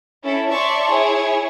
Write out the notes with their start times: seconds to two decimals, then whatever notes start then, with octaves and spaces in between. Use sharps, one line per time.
0.23 C#4 E4 A4
0.51 C#5 D5 E5 A5 C6 C#6
0.88 E4 G#4 C#5